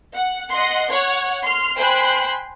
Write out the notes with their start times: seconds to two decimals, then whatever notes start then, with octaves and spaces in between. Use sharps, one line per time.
0.15 F#5
0.51 D#5 F#5 C6
0.91 C#5 F#5
1.42 C6 F6
1.76 C5 G5 G#5 B5 C6 F#6